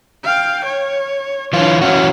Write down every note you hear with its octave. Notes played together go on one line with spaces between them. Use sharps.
F5 G5
C#5
E3 D4 F4 C#5
E3 F#3 C#4 F#4 F5